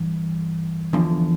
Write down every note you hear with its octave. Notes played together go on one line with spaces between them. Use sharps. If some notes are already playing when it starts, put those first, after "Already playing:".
Already playing: G2 E3
E2 D3 F3